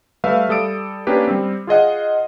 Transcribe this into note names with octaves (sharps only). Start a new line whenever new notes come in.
G3 A3 B4 E5 F5
G3 A4 D#6 D7
A#3 C#4 D4 G4 B4
G3 C4
F4 G#4 D#5 F#5